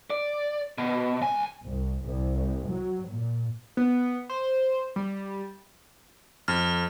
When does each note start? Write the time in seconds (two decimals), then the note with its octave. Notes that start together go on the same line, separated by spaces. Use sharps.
0.10 D5
0.78 B2
1.22 C#2 G#5
1.64 C2
2.04 C2
2.69 F#3
3.10 A#2
3.77 B3
4.29 C5
4.96 G3
6.48 F2 F6